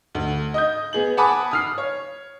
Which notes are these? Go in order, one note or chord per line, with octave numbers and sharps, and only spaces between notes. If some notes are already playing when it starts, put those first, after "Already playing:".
D2
D#5 D#6 G6
B3 G#4 F#7
F#5 G#5 A5 B5 D6 D#6
D#6 F6 C7
C#5